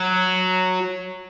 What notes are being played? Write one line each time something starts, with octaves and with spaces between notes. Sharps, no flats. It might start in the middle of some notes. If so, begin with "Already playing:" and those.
Already playing: F#3